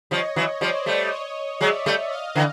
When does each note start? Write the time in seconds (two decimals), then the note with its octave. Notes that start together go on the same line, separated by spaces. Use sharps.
0.11 F3 G3 C#5 D#5
0.36 E3 F#3
0.61 F3 G3 C5 D5
0.86 G3 A3
1.11 C#5 D#5
1.61 F#3 G#3 D5 E5
1.86 G3 A3
2.11 D#5 F5
2.35 D3 E3